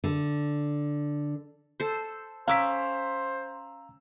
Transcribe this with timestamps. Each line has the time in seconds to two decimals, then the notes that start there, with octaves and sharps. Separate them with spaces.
0.04 D3
1.80 A4 C5
2.48 C#4 C5 F5 A#5 D6 E6 B6